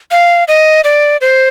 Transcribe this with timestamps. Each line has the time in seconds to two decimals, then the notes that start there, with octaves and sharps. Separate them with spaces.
0.11 F5
0.48 D#5
0.84 D5
1.21 C5